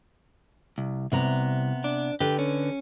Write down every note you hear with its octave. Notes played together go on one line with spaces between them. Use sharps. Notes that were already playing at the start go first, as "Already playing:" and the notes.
C2
C2 C3 B3 A#5
D4
D3 G4 B4
C#4